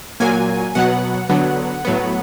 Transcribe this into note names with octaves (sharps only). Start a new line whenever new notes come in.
A#2 F#3 A#3 G#5
B2 F#3 B3 F#5
D3 F#3 B3
A2 F#3 B3